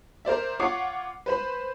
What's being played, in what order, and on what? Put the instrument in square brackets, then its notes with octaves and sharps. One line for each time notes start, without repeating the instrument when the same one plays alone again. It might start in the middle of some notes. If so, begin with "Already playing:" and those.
[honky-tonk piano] A#4 C5 D5 E5
F4 C#5 F#5 D6 C7
B4 C5 B5